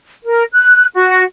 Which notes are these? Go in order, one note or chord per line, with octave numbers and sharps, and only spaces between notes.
A#4
F#6
F#4